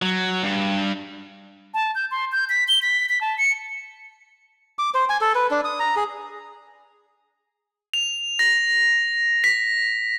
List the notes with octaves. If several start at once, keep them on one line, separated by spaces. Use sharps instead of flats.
F#3
G2
A5
G6
C6
G6
B6
G7
B6
B6
A5
C#7
D6
C5
G#5
A4
B4
D4
D#6
A#5
G#4
F7
A#6
B6